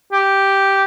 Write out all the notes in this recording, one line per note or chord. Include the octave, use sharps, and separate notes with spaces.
G4